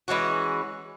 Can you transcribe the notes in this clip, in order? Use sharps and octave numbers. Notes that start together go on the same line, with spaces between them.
E3 G#3 C#4 F#4